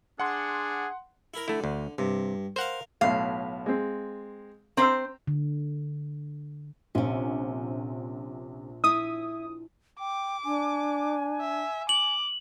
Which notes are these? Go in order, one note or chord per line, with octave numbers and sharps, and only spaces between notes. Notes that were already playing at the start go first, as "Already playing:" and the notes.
D4 G#4 F#5 C6
E4 A#4
D3 A3 E4
D2
G2 C3
A#4 C5 F5 F#5
B1 A2 F5
G#3 C4
C4 C5 A#5 E6
D3
A#1 C3 C#4
E4 D#6
G5 D6
D4 G#5
E5
D6 F#7